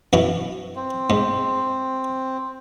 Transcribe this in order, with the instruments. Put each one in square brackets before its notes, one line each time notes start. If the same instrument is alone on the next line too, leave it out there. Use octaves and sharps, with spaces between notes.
[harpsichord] F#2 E3 E4
[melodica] C4
[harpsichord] G#2